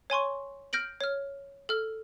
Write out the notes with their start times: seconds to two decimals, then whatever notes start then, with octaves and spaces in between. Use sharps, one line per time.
0.10 C#5 G#5 C6 C#6
0.73 F6 G6 A#6 D7 F#7
1.01 C#5 F6
1.69 A4 F6